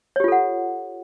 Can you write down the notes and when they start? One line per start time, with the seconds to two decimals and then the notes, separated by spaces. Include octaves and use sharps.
0.16 C#5
0.20 G4
0.24 F4
0.28 A4
0.32 F#5